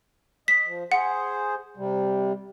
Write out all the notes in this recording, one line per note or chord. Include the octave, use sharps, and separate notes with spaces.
D#5 B6
F3
G#4 C5 F#5
C3 G3